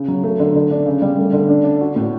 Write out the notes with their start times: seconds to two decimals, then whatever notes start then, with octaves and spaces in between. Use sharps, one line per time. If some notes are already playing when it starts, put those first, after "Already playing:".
Already playing: C#3
0.08 F#3
0.24 A3
0.40 D3
0.55 D3
0.71 D4
0.86 C#3
1.02 G3
1.18 A3
1.33 D3
1.49 D4
1.64 D4
1.81 F#4
1.96 A2